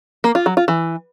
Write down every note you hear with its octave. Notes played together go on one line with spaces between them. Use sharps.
A#3
F4
F#3
F4
E3